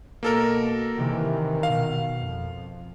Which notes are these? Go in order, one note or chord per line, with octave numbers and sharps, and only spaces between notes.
B2 A#3 A4 A#4
C3 D#3 E3
B2 F5
F2